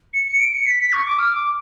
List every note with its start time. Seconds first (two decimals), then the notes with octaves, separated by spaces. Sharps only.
0.13 C#7
0.27 C#7
0.40 D7
0.54 C#7
0.67 B6
0.80 B6
0.93 C#6
1.06 D6
1.19 F6
1.32 D6